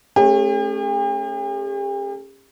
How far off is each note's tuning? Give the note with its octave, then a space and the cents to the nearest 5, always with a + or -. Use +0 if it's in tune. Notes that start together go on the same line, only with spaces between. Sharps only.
A3 +0 C#4 -25 G4 +45